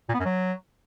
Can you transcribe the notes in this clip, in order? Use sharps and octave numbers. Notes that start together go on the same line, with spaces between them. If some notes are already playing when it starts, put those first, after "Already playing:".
A#2
B3
F#2
F#3